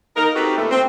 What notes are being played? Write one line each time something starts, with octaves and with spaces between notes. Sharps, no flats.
D#4 A#4
C4 D#4 F#4 G4 A4 B4
A#2 D3 G3 A3
C4